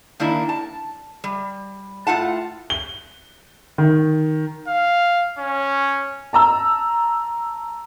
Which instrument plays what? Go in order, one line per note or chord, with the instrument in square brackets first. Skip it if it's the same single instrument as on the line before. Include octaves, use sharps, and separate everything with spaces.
[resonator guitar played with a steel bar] D#3 A#3 D4 E4
A5
G3
A2 F4 F#5 A5
[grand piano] G7
D#3
[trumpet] F5
C#4
[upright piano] A5 A#5 E6